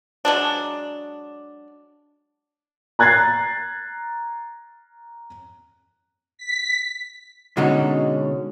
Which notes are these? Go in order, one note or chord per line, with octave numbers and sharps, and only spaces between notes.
F#3 G#3 D4
A#5 F#6 G#6 A6 C7
B6
B2 D3 G#3 C#4 D#4 F#4